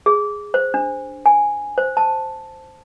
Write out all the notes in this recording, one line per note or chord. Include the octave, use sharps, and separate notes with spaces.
G#4
C5
D4
G#5
C5
A5